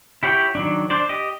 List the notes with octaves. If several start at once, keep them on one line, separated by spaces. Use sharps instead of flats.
E4 G4 C#5 F#5 G5
D#3 F#3 D4
D4 C5 D5
G4 D#5